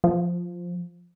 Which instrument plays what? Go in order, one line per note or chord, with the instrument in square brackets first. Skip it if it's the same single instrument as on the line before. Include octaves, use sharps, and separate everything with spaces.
[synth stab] F3